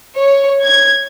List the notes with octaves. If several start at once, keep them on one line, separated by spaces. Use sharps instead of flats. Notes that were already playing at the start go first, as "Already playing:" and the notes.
C#5
G#6